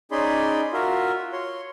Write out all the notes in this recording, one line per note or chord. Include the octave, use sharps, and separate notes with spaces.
C#4 D#4 G#4 D5 B5 C6
F4 F#4 A#4 E5
C#5 C6